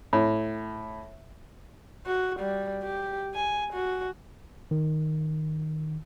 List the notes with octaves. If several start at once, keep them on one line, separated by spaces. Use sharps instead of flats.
A2
F#4
G3
G4
G#5
F#4
D#3